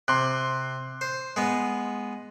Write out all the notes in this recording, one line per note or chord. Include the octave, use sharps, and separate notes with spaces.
C3 C6 F#6
C5
G#3 B3